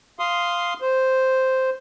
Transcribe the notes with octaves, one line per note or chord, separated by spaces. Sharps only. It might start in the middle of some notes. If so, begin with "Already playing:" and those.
F5 C6 D#6
C5